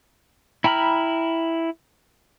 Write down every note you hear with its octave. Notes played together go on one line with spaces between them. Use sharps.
E4 G5 A#5 B5 F6